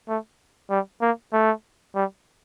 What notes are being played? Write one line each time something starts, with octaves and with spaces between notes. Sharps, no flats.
A3
G3
A#3
A3
G3